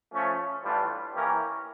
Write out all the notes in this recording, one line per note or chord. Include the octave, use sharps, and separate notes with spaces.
F3 A3 C#4
A2 E3 G3 D4 F4
E3 A#3 C#4 G4 A#4